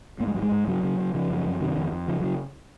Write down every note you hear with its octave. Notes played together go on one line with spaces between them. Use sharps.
G#2 A#3
G#3
G#2 F#3
G#3
G#2
C#3 F#3
C#3
C#3
C#3 F3
F#2
F#2
C3 D#3
F2
F2
C#3 F3
C#3 F#3